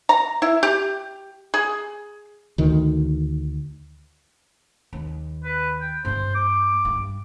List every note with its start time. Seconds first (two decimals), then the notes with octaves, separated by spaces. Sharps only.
0.09 A#5
0.42 E4
0.63 G4
1.54 G#4
2.58 D2 D#3
4.93 D#2
5.44 B4
5.81 G5
6.05 G2 A#3 C5
6.35 D6
6.85 G2